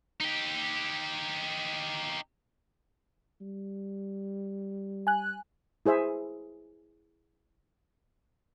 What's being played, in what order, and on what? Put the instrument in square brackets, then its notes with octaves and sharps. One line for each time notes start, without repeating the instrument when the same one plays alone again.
[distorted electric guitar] D#4 G4
[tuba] G3
[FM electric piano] G#5 F#6
[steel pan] E4 G#4 C5 E5